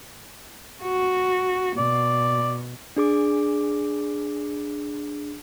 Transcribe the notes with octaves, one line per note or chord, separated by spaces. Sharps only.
F#4
B2 D5
D4 G#4 D6